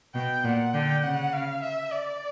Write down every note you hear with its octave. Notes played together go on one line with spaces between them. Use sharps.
B2 G5
A#2 F#5
D3 G5
C#3 F#5
F5
E5
D5